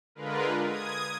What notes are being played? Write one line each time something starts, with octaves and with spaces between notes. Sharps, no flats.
D3 G#3 F4 A#4 B4
D#6 G#6